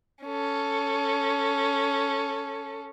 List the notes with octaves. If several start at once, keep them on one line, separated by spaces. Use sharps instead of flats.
C#4 A4